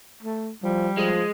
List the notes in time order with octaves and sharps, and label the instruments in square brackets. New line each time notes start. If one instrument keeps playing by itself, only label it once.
[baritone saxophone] A3
[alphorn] F3 [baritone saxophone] G3
[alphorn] F3 [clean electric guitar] G#3